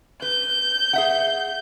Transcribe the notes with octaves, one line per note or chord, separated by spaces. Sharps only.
B4 G6
G#4 E5 F#5